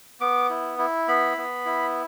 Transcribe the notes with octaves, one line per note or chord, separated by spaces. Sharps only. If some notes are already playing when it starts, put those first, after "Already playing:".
B3 D6
E4
E4
B3 B5
B3
E4